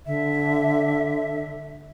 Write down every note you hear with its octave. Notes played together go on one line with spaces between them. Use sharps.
D3 E5